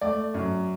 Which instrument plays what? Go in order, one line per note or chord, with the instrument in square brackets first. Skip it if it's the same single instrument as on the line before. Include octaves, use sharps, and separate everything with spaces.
[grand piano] A3 D5
F#2